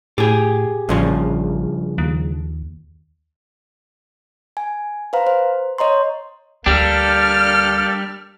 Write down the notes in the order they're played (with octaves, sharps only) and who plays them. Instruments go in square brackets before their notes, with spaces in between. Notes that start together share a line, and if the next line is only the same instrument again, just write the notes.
[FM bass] A2 [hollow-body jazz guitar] G4 G#4
[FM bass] A1 [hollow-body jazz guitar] G2 C#3 F3
[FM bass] D#2
[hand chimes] G#5
B4 C5 F5 A#5
C5
C#5 D#5 A#5 C6
[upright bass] D2 A3 [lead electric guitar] G3 D4 [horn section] A#3 G4 A4 [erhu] F6